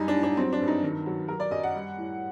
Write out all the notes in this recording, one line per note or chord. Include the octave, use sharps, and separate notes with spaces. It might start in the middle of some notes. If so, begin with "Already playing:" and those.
Already playing: F#2 G3 D#4
D4
A2
D4
F#3 C4
D4
G2
D#4
D#3
F#3
F#3 A#4
D5
F#2 D#5
F#5
G3
A2